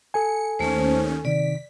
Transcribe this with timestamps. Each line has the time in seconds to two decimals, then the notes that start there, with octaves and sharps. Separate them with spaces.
0.14 A4 G#5 C#7
0.59 D#2 D#3 A3 C#4 C5
1.25 C3 D#3 D5 B6